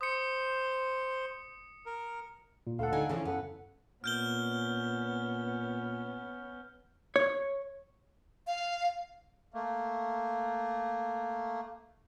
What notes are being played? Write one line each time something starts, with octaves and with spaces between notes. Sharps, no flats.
C5 D#6 C#7
A#4
A#2
D2 A4 F5 F#5
D3 D#4 G#5
C#3 E3 F3 C#4
F#2 B3 A4 F#5
A#2 B3 C#4 F6 G6 G7
C#5
F5
A3 A#3